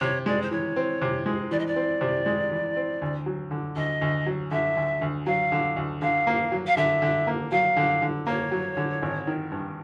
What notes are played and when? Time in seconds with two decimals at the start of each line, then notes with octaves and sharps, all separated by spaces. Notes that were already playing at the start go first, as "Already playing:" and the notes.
0.01 C3 C#5
0.26 G#3 D5
0.41 C5
0.51 E3 C#5
0.76 C4
1.02 C3
1.26 G#3
1.51 E3 D5
1.59 D#5
1.66 D5
1.76 C4
2.01 C3
2.26 G#3
2.51 E3
2.76 C4
3.02 D2
3.26 F#3
3.51 D3
3.76 D2 D#5
4.01 D2
4.26 F#3
4.51 D3 E5
4.77 D2
5.01 D2
5.27 F#3 F5
5.52 D3
5.76 D2
6.02 D3 F5
6.27 A#3
6.52 F#3
6.67 F5
6.77 D3 E5
7.02 D3
7.27 A#3
7.51 F#3 F5
7.77 D3
8.02 D3
8.27 A#3 C#5
8.51 F#3
8.77 D3
9.02 G#1
9.27 D#3
9.52 G2